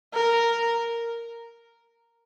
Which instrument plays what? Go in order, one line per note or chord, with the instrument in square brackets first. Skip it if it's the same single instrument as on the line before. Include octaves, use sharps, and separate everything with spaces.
[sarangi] A#4